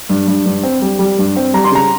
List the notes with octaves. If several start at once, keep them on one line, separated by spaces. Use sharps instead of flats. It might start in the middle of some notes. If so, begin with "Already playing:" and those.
G2
G2
G2
C4
G3
G3
G2
C4
G3 A#5
C6
C#3 A#5